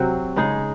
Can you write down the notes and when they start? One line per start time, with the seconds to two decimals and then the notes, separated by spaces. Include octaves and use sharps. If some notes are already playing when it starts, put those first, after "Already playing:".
Already playing: C3 F#3 C4 F#4
0.36 C#3 G#3 D#4 G#4